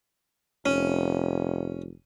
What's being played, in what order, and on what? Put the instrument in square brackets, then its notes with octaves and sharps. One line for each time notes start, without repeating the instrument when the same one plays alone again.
[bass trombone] F1 [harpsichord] C#4